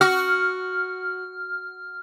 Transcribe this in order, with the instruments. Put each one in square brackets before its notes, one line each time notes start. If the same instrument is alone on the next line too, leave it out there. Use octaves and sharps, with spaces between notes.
[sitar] F#4 [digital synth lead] F6